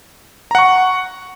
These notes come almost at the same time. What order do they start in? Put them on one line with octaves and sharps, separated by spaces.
A#5 F#5 C#6